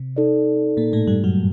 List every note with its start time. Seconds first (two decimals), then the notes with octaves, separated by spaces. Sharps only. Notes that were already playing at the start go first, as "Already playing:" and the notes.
Already playing: C3
0.16 D#4 A4 D5
0.77 A#2 A#3
0.93 A2 A3
1.07 G2 G3
1.24 F#2 F#3